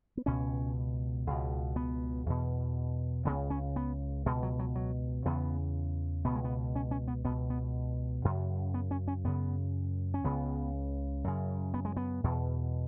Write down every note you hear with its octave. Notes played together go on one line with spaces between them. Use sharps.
B3
C#2 B2 C#4
C#2 B2
B3
E2 B2
C#2 C#3 B3
C#4
B3
C#2 B2 G#3
F#3
F#3
F#3
E2 C#3 B3
C#2 B2 B3
G#3
B3
C#4
C#4
B3
C#2 B2 B3
B3
F#2 C#3
B3
C#4
C#4
F#2 C#3 B3
C#4
C#2 C#3 B3
F#2 C#3
B3
G#3
B3
E2 B2